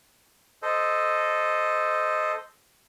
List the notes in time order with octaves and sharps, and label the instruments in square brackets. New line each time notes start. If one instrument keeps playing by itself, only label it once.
[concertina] A4 C5 D#5